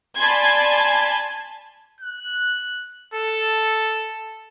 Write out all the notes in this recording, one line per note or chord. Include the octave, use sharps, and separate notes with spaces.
D5 G#5 A5 B5 C6 G#6
F#6
A4